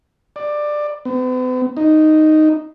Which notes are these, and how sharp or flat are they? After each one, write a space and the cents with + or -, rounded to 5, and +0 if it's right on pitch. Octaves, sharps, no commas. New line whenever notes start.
D5 +15
B3 +45
D#4 -5